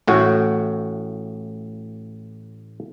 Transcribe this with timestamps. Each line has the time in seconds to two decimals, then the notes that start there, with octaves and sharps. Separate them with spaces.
0.07 A1 A2 F#4